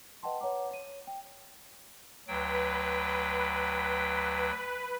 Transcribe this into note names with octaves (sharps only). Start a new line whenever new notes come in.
B4 D#5 F#5 G5 A5 C6
B4 C#5 F#5 A#5 D6
C#5 D#7
G5
D2 F#3 B4 G5